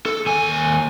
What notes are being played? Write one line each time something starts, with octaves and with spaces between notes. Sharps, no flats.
A4
D#2 G#5